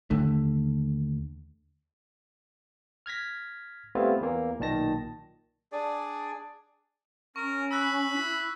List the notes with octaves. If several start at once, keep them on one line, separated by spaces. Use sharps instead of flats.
D#2 D3 A3
F6 G#6 A#6 B6
G3 A3 B3 C4 E4 F4
E2 E3 A#3
B1 A#2 D#3 A5 A#6
D4 G#4 D5
C#4 A#4 C#6
B5 E6 F#6 B6
E4 B6